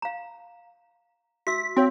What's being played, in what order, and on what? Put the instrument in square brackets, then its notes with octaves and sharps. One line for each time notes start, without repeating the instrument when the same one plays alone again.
[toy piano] F5 A#5
[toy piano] F#4 E5 E6 [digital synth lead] B6
[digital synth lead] C4 [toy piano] F#4 C#5 F5